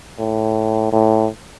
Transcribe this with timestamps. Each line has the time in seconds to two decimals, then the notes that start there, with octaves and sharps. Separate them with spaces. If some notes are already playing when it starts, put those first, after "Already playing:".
0.19 A2
0.92 A2